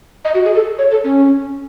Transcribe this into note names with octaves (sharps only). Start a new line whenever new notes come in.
D#5
F#4
G#4
A4
C#5
A4
C#4